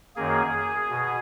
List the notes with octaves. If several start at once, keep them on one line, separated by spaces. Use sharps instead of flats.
F#2 D#3 A#3 G#4
B2